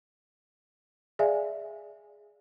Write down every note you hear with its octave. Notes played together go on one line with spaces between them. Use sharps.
G#4 D5 E5 F5 G#5